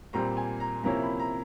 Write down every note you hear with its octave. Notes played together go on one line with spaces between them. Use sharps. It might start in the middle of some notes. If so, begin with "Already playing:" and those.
A#2 G3 C4 A#5
G#5
A#5
C3 F3 A#3 C#4 E4 A#5
B5
A#5